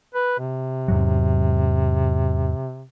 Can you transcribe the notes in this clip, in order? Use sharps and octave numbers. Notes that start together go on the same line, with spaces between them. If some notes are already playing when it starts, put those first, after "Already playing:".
B4
C3
E2 G#2 F#3